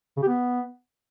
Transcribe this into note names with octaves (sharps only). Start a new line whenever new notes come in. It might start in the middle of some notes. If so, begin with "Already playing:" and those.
C#3
G4
B3